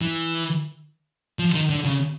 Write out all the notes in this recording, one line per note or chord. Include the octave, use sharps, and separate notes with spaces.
E3
F3
D#3
D3
C#3